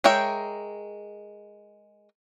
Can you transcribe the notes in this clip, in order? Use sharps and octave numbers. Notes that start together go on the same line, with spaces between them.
G#3 A#4 C#5 E5 G5